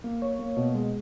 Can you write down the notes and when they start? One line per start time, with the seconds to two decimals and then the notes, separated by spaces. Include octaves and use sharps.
0.04 A#3
0.22 C#5
0.39 A#3
0.57 B2
0.75 G#3